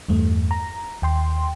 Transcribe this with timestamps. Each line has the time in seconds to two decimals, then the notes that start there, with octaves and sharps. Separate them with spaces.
0.09 E2 G2 A3
0.51 A#5
1.02 D#2 G5 C6